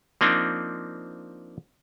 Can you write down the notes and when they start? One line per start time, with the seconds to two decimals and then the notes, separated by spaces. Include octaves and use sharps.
0.21 F3 A#3 C4 D4 D#4